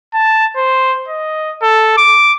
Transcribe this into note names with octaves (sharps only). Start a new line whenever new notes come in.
A5
C5
D#5
A4
D6